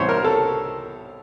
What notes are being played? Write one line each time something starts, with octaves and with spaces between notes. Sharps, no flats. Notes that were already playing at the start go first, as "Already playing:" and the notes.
Already playing: C2 C3 E3 G3 B3 C5 C#5
A#4
A4